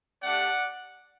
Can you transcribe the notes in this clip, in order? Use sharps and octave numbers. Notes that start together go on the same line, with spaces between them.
A3 D4 G4 D5 F#5